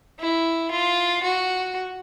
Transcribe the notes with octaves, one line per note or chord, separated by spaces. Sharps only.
E4
F4
F#4